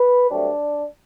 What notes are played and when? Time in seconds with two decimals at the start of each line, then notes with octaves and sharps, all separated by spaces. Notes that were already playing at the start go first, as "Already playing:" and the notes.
Already playing: B4
0.30 G2 F#3 A3 C4 D4